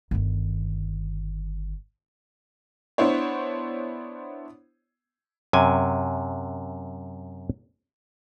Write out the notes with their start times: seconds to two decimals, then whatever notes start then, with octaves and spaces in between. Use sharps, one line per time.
0.11 G1 D#3
2.98 B3 D4 E4 C5 C#5
5.53 F#2 C3 G#5